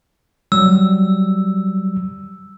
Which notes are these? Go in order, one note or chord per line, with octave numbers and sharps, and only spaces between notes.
F#3 G3 E6